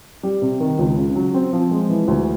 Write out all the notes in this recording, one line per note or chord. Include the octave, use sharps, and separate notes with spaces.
G3
C3
D#3
C#2
C#3
F#3
C4
F3
G#3
E3
D2